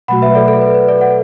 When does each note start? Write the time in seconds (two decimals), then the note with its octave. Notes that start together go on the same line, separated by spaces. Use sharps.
0.08 B2 F#3 A3 F#4 F#5 B5
0.22 B4 E5
0.35 A4 D5
0.48 A4
0.61 B4
0.74 B4
0.88 A4 D5
1.01 D5 F#5